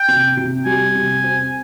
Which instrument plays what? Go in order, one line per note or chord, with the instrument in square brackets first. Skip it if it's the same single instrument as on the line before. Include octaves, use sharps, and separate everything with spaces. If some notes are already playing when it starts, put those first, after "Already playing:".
Already playing: [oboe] G5
[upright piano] C3
C3
[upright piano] G3 [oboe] G#5
[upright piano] C3
C4